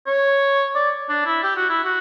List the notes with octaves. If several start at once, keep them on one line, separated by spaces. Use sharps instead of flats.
C#5
D5
D4
E4
G4
F#4
E4
F#4